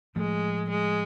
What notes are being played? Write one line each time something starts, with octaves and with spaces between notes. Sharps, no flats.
A2 F3 G#3 A3
G#3